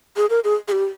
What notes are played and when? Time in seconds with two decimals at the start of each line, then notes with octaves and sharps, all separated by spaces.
0.16 G#4
0.30 A#4
0.44 G#4
0.68 G#4
0.72 G4